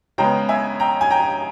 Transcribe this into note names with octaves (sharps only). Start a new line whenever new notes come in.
C#3 G#3 B3 G5 A#5
E5 G#5
G5 A#5
G#5
G5 A#5